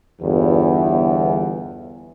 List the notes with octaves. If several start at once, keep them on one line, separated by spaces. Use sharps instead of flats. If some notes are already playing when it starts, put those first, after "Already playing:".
G1 E2